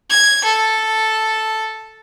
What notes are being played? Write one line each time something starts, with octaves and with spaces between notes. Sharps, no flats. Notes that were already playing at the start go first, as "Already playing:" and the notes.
G#6
A4